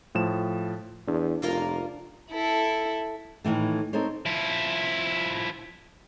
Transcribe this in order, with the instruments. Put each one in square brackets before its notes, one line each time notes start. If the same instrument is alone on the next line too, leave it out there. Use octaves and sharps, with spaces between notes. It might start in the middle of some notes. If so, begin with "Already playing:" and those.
[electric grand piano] A2 F3 E7
[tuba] E2 [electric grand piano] D4
[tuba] F1 [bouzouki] A#3 F4 A#4
[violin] E4 A4
[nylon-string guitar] A2 D#3 E3 A3
C4 D#4 A4 A#4 C5 C#5
[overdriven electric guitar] F3 E4